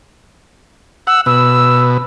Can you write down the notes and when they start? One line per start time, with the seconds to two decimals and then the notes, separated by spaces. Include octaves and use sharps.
1.07 F#5 E6
1.26 B2 E6